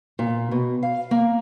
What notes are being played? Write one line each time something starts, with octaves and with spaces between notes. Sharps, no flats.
A#2
B2
F5
A#3